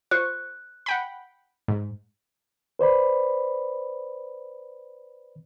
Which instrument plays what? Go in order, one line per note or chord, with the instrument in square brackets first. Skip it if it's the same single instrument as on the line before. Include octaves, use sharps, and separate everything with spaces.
[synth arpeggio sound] F4 C5 C#6 [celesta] F#6
[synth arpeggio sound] F#5 G5 B5
G#2
[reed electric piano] B4 C5 D5 B5